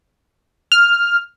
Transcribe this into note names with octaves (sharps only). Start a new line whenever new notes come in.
F6